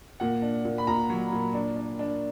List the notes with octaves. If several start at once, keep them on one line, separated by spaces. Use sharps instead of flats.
A#2 F#5
D4
A#2
B5
A#2 A#5
F#3
A#2
D4
D4
D4